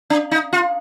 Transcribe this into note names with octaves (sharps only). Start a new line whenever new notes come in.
D4
D#4
F4